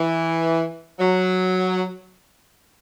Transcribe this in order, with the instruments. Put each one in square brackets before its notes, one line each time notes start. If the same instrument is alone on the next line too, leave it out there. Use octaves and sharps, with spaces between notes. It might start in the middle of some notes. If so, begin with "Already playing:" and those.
Already playing: [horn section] E3
F#3